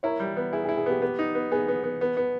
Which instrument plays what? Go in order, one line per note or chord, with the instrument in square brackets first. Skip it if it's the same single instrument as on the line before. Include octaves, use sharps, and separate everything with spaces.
[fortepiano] E4 [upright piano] A#4 C#5
[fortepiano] G3
B3
[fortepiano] E4 [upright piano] G#4
[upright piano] G#4
[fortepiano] E4
[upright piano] G#4
[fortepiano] B3 [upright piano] G4
[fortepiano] B3 [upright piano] G4
[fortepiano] D#4
B3
[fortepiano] B3 [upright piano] G#4
[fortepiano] B3
B3
B3
B3